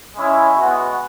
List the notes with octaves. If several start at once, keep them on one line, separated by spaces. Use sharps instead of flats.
G#3 C#4 E4
G#3 B3 F#4 F#5